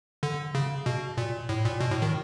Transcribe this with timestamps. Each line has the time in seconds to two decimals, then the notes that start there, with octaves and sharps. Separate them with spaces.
0.23 D3
0.55 C#3
0.86 B2
1.17 A#2
1.49 A2
1.65 A#2
1.80 B2
1.91 A2
2.02 D#3